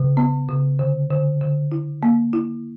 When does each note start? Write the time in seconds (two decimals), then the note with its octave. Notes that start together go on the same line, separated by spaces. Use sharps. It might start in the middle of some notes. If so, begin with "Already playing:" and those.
Already playing: C#3
0.17 B3
0.49 C#3
0.79 D3
1.11 D3
1.41 D3
1.72 E4
2.03 A#3
2.33 E4